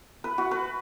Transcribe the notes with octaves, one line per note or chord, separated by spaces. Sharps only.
B4
F#4
B4